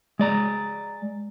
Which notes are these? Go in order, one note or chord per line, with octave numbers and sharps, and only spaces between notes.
G#3 D5 A#5